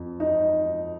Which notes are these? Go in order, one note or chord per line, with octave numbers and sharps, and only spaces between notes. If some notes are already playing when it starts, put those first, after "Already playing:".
Already playing: F2
D#4